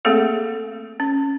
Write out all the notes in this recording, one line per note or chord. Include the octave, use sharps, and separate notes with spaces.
A3 A#3 C4 G#4 A4 F5
C#4